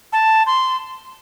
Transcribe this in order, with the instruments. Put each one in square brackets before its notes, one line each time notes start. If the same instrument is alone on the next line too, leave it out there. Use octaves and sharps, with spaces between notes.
[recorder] A5
C6